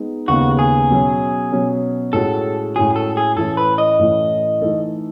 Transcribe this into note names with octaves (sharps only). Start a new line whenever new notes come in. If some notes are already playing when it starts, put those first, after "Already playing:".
Already playing: G#3 B3 D#4
D#2 C#3 G#3 B3 D#4 F#4
G#4
B2 F#3 C#4
B2 F#3 C#4
A2 G#3 C#4 F#4 A4
A2 G#3 C#4 F#4 G#4
A4
G#4
A2 E3 A3 C#4 A4
B4
D#5
A2 E3 A3 C#4
E3 A3 D#4 A4